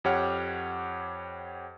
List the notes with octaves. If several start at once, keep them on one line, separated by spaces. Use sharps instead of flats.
F2 G4 C#5 F#5 F6